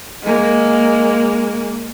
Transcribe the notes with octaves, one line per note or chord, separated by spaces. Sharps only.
G#3 A#3